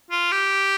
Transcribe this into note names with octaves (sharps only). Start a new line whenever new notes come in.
F4
G4